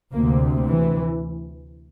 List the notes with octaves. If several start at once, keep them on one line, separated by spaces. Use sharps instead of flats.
D2 C3 A#3
E3